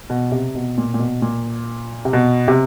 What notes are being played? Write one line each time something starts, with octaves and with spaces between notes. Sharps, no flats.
B2
C3
B2
A#2
A#2
B2
A#2
C3
B2
C3